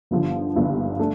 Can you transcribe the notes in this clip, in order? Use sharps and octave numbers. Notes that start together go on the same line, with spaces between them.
G1 G2 D3 F3
G1 G2 D3 F3
A3 D4